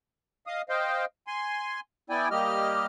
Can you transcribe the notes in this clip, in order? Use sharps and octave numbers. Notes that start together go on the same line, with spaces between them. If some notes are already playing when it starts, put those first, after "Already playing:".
D#5 F5 D#6
C5 D#5 F5 G5
G#5 C6
B3 E4 D5 G5 G#5
G3 A#3 G4 D#5 F6